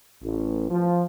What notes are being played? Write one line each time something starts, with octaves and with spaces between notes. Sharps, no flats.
A1
F3